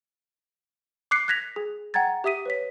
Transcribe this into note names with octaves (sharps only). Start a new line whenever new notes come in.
D6 F#6 C7 C#7
F#6 G#6 A#6 B6 F7
G#4
F#5 G5 A#5 G#6 A6
G4 E5 D#6 B6 D#7
B4 C#5 B6